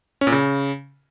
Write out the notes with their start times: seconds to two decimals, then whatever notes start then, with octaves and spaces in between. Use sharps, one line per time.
0.21 C#4
0.27 A#2
0.32 C#3